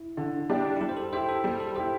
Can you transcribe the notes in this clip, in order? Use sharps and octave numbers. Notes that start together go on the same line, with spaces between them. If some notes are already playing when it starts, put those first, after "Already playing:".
Already playing: E4
D3
G3 D4 G4 D5
E4
G3 G4
C5
A4
E4 G4 C5
A4
G3 G4
A4
E4 G4 C5